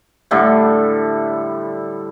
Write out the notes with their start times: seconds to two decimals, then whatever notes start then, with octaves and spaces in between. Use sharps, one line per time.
0.31 A2 D3 G3 A3